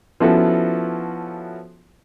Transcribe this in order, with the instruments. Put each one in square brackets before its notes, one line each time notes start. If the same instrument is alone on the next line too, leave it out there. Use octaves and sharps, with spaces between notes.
[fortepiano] F3 B3 C#4 E4 F#4 A4